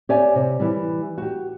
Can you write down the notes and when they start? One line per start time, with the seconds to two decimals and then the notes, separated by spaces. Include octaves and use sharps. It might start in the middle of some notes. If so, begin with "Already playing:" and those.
0.09 G4 C#5 D5 E5 G#5
0.35 C3
0.60 E3 G3
1.18 F#4 G4